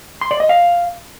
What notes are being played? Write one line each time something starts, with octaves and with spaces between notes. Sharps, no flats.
C6
D5
D#5
F5